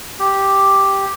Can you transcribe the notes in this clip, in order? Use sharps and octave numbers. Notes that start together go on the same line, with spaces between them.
G4